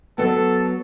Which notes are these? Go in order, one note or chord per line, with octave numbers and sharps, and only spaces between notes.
F#3 B3 A4